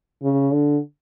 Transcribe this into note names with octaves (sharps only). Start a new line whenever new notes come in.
C#3
D3